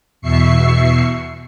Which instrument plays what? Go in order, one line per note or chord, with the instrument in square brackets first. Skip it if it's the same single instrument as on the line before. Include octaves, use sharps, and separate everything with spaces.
[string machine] E2 B2 E5 C#6 C7 C#7